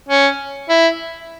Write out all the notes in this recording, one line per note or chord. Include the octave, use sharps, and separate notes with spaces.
C#4
E4